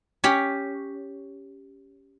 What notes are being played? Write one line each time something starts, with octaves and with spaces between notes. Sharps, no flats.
C#4 G4 C#5